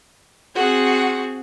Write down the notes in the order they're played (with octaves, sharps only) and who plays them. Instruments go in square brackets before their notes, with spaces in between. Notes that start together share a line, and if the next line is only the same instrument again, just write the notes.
[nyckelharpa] C4 G#4 [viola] F#4 F#5